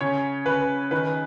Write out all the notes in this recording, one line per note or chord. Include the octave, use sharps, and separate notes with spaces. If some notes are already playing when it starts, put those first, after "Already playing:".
C#3 C#5
C#3 B4
D#3 B4